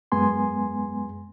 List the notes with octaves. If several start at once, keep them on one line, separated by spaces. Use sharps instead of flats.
F#2 G#3 B3 G#5 C6